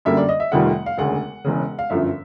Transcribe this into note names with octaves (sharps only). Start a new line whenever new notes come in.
F#2 D3 G3 A#3 E5
D5
D#5
E5
F1 F2 C3 D#3 G3 F#5
F5
E1 D2 C#3 F#5
E1 E2 C#3
F5
G1 F#2 D3 F3 E5